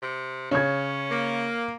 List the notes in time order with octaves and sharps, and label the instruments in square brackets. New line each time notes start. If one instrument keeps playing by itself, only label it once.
[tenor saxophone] C3
[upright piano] C#3 [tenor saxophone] C#4 [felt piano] C#5 G#6
[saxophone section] A#3